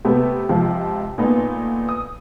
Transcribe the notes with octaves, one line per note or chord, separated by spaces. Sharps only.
C3 A3 B3
C#2 C3 F3
A#2 A3 B3 D#4
D#6